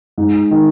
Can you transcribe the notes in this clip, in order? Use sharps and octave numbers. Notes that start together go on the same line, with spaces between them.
G#2
D#3